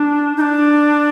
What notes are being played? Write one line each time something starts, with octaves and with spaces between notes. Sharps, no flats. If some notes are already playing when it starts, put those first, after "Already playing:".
Already playing: D4
D#4
D4